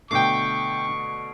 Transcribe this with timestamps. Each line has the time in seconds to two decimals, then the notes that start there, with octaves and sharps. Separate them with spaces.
0.11 B2 D3 A3 G5 C#6 D6 C7 D7